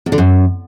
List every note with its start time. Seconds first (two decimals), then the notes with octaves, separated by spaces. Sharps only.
0.06 E2
0.12 D3
0.18 F#2